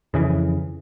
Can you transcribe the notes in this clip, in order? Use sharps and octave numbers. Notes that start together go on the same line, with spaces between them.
F2 C#3 E3